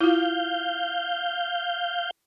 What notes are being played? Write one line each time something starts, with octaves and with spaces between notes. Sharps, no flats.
E4 F4 F5 G6